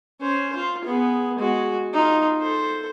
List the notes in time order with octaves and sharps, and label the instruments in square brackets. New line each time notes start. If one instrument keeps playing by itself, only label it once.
[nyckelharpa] C#4 C5
F4
B3 G#4
G#3 F#4
D#4 F4
A4 C5